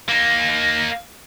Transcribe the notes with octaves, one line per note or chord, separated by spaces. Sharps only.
A#3 D#4